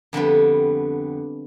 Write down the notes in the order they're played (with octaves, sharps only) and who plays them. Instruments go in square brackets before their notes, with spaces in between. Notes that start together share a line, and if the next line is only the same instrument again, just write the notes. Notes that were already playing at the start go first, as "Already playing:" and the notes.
[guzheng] F2 D3 G3 B3